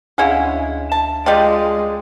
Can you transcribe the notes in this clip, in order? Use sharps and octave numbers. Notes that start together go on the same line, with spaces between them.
D2 G#3 C#4 E4 G#4 F5
A5
G3 G#3 F4 D5 D#5 G5